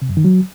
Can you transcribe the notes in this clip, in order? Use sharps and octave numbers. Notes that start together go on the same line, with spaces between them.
C3
F#2
D#3
F#3